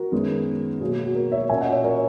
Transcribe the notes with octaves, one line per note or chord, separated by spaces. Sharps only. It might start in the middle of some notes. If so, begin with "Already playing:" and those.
Already playing: F#4 A#4
F#2 D#3 G#3 B3
B2 F#3 A#3 G#4
G#4
F#4
F#4 A#4
C#5 E5
A#2 A#3 C#4 E5 G#5
D#5 F#5
C#5 E5
A#4 C#5